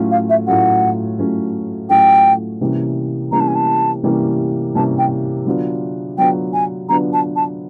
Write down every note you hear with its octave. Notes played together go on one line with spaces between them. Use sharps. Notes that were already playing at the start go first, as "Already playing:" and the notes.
Already playing: A2 F#3 A3 C#4 F4
F5
E5
A2 F#3 A3 C#4 F4 F#5
A2 F#3 A3 C#4 F4
A2 F#3 A3 C#4 F4 G5
C3 E3 G3 A#3 C#4
C3 E3 G3 A#3 C#4 A#5
A5
G#5
A5
C3 E3 G3 A#3 C#4
C3 E3 G3 A#3 C#4 A5
G5
D3 F#3 B3 D4 F4
D3 F#3 B3 D4 F4 G5
G#5
D3 F#3 B3 D4 F4 A#5
A5
A5